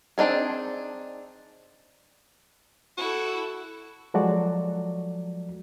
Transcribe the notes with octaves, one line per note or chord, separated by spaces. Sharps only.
C4 D4 D#4 G#4
E4 F#4 A4
F3 F#3 G#3 F#4 A4 D5